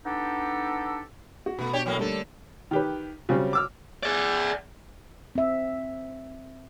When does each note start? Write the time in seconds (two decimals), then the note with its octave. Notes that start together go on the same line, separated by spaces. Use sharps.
0.05 B3 D4 D#4 G4 A4
1.46 F#4
1.59 B2 A3 B3
1.73 D4 G4 C#5
1.86 A2 F#3 A#3
1.99 D3 G3 A3 A#3 A4
2.71 D#3 G4 B4
3.29 C#3 F#3 G3 C4 C#4
3.53 D6 E6 F6
4.03 G#4 D5
5.35 C4 E5